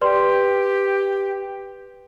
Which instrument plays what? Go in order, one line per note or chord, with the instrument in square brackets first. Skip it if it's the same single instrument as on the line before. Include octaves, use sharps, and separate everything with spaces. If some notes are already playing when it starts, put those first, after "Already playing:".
[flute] G4 [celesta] B4 D5 C6